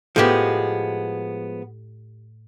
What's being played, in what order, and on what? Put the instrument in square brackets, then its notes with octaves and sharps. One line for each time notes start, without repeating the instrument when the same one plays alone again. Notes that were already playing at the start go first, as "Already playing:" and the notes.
[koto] A2 G4 [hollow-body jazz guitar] F3 G#3 B3